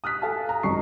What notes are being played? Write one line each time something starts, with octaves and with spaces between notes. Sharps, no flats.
D#6 F6 F#6 B6
A4 F5 G#5 A5
A#5
G#1 F#2 D#5 C#6 C7